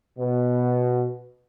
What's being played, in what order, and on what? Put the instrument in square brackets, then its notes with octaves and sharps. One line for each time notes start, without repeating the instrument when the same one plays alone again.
[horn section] B2